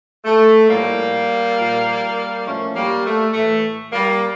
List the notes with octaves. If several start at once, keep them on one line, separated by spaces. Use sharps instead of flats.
A3
A2 F3 G3 A#3
A#2 F3
A2 F3 A3 C#4
G3 A#3
A3
A2 E3 A3
G3 A#3